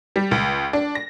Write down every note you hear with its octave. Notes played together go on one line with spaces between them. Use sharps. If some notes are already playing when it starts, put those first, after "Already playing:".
G3
C#2
D4
A#6